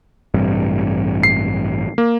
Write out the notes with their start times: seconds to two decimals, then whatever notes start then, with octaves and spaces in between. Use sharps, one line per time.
0.34 A1 G2 C3
1.23 C7
1.98 A#3